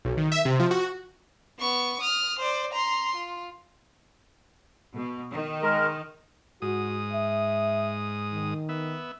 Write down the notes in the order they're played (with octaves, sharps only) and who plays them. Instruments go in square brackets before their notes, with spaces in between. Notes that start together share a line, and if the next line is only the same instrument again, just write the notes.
[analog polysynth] B1
D#3
E5
C3
F3
F#4
[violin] B3 C#6
D#6 F6
C5 D5
A#5 C6
F4
[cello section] B2
D#3
[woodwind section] G#3 A#4
[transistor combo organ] G#2 D#6 [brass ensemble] F#4
[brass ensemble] E5
D#3
[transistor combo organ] B3 E5